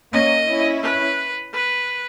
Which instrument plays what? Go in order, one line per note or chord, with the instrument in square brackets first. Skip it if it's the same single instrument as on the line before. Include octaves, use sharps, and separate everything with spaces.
[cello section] A#3 C#4 [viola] D#5
[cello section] C#4 E4
[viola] B4
B4